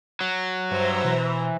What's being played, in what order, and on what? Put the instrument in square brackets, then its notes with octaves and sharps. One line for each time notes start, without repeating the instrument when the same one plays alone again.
[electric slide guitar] F#3
[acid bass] G2 [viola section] C5 E5 A#5
[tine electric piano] B2 [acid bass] E3